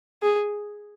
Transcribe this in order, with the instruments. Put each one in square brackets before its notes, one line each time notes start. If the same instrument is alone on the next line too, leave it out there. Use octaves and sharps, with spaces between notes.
[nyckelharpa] G#4